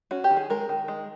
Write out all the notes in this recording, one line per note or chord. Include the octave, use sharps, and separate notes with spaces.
C#4 F#4
G4
D#3
G#4
G#3 A#4
D#3
G#3